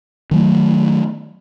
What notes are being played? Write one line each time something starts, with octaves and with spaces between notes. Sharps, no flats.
D#3 F#3 A3